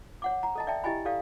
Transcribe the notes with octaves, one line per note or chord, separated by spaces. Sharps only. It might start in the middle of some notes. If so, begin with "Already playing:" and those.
C#5 F#5 D6
A#5
A4 D#5 A5
D5 E5 G5 A5
E4 G4 D#5 G5 G#5 B5
G4 A4 D5 F5